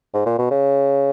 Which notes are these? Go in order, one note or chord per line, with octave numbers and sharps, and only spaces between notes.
G#2
A#2
B2
C#3